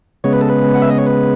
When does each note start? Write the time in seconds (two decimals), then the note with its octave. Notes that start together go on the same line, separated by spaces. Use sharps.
0.24 C#3 G#3 B3 C#5
0.33 B4
0.41 A4
0.50 B4
0.74 F#5
0.82 E5
0.90 D#5
0.98 C#5
1.07 B4